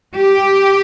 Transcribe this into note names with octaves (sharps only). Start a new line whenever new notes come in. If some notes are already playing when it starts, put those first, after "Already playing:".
G4